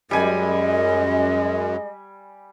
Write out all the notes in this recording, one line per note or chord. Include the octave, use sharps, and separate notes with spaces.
F#2 G3 G#3 D#5 G#5 B5